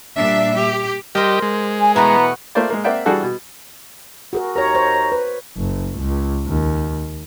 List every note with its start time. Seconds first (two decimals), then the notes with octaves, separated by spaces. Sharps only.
0.17 A#2 G3 D4 E5
0.58 G4
1.15 G3 G4 A#4 C5 D#5
1.42 G#3
1.81 G#5
1.96 B2 E3 A3 B3 F#4 A#5
2.55 A3 A#3 F4 C5 D5
2.70 G#3 A#3
2.84 A#3 C4 D5 E5 F#5 G5
3.06 E3 G3 D4 F#4 G#4 A4
3.23 B2
4.33 F#4 G#4 A#4
4.55 D#2 A#4 C#5 A#5
4.75 C5 C#5
5.12 B4
5.57 F#1
5.98 C#2
6.47 D#2